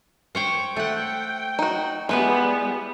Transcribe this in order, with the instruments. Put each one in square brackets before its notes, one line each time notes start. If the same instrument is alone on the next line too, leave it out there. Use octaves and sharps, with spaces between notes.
[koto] C5 C#5 G5
[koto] A3 F#5 [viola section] G5
[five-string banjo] D#4 F#4
[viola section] G3 B3 [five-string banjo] G#3 G#4 [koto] E4 B4